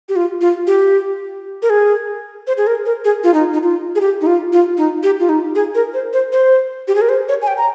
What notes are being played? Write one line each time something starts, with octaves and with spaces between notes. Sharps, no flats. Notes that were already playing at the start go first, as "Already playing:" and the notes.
G4
F4
F4
G4
A#4
G#4
C5
G#4
A#4
A#4
G#4
F4
D#4
D#4
F4
G#4
G4
D#4
F4
F4
D#4
G4
F4
D#4
G#4
A#4
C5
C5
C5
G4
G#4
A#4
C5
C#5
G#5
G5
A#5